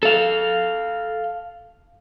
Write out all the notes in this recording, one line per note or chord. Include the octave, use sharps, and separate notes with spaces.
A4 F5